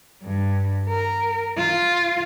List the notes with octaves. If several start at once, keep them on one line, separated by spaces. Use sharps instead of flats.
G2
A#4
F4